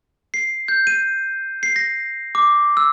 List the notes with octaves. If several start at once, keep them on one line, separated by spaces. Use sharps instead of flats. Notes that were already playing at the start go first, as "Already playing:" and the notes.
C7
G6
D#7
C7
A#6
D6
E6